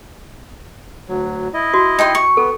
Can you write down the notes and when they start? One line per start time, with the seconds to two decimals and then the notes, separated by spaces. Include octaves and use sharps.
1.08 D2 F#3
1.54 E4 D#5
1.74 F#4
1.99 D#4 G5 C6
2.15 C#6
2.37 B3 A4